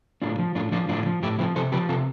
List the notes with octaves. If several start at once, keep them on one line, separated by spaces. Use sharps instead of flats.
A2 D4 F4
F3
A2 D4 F4
F3 D4 F4
A2 D4 F4
F3
A2 E4 G4
F3 C4 E4
C3 A4 C5
F3 G4 B4
C3 F4 A4